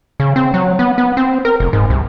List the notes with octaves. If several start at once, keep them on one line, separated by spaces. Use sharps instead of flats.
C#3
C4
F#3
B3
B3
C4
A#4
F1
G#2
C2